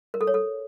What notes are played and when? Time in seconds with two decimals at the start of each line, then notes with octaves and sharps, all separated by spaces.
0.14 A#4
0.21 A4
0.27 C#5
0.34 A4